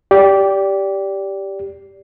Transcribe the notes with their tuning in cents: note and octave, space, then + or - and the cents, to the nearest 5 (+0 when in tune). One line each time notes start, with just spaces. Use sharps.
G4 +0 D5 -20